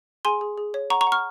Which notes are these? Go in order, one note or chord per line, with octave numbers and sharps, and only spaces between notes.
G#4 G#5 C6
G#4
G#4
C#5
F#5 A#5 C#6
A#5 C#6
F#5
C#6 F6